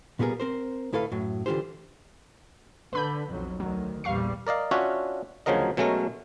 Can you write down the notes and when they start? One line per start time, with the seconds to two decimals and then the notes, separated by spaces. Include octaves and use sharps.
0.19 A#2 G3 B3 G#4 A#4
0.40 C4 A#4 C5
0.92 D2 A2 E4 A4 B4 F5
1.12 F#2 A2 F#3
1.46 D3 E3 F4 G4 C5
2.93 D3 B4 B5 G6
3.27 B1 F2 F#3
3.60 D2 D#3 F#3
4.04 A#1 E2 G3 F5 C#6 C7
4.47 A#4 D5 D#5 F5
4.71 C#4 D4 F4 F#4 C#5 E5
5.46 D2 C#3 F3 F#3 A#4 D#5
5.77 B2 F#3 G#3 A3 C#4 A#4